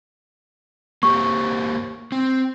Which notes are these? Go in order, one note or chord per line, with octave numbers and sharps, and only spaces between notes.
A#3 G4 C5 C#6
C4